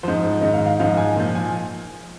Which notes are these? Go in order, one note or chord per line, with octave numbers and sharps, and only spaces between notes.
G#2 F3 C5
G#2 D#3 D#5
F5
F5
G#2 F3 F5
G#5
A#2 F3
G#5